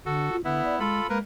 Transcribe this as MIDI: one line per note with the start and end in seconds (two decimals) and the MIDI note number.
0.06 0.32 50
0.06 0.36 66
0.06 0.36 69
0.32 0.44 65
0.45 0.62 50
0.45 0.79 59
0.45 0.79 64
0.64 0.75 74
0.80 1.01 56
0.80 1.07 65
0.80 1.07 69
0.80 1.07 83
1.10 1.20 56
1.10 1.18 58
1.10 1.18 70
1.10 1.18 71